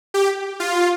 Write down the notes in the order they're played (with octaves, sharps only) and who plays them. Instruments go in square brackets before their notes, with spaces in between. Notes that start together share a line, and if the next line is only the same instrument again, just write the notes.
[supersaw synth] G4
F4